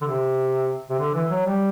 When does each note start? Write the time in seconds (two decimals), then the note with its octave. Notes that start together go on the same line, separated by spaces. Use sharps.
0.01 D3
0.07 C3
0.90 C3
0.99 D3
1.14 E3
1.30 F#3
1.46 G3